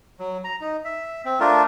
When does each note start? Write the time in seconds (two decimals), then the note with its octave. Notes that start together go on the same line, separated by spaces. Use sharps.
0.19 F#3
0.44 A#5
0.61 D#4
0.84 E5
1.25 C4
1.40 A3 D4 F4 A#4